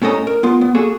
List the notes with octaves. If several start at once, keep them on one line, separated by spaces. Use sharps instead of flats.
A2 C#4 A4 D#5 A#5
A#4
B3 F4
B3
A#3 F#4 G#4 A4